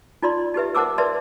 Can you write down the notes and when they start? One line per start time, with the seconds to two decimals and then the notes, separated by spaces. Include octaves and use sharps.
0.22 D#4 F4 D5 C6
0.54 D#4 G4 B4 E5
0.75 A#4 C5 F#5 A5 D6 E6
0.98 A#4 B4 D5 E5 A5 C6